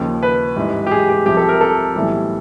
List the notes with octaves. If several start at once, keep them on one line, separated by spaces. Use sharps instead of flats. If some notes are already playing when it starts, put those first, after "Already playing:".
Already playing: D#2 C#3 F3
B4
A1 G#2 E3 G3
G4
G#4
G4
C2 C3 F3 G4
A4
A#4
A4
B1 A2 E3 G3